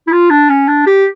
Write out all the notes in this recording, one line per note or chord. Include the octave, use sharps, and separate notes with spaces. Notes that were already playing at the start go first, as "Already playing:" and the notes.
E4
F4
D4
C#4
D4
G4